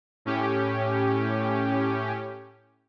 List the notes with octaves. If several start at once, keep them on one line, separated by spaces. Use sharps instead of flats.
A2 C#4 G4